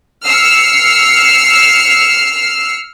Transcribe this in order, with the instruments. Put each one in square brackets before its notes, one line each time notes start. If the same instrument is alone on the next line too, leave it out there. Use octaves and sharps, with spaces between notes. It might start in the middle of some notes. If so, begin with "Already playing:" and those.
[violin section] E6 F6 C7 C#7